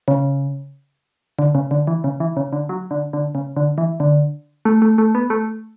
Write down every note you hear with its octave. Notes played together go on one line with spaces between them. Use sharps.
C#3
D3
C#3
D3
E3
C#3
E3
C#3
D3
F#3
D3
D3
C#3
D3
E3
D3
A3
A3
A3
B3
A3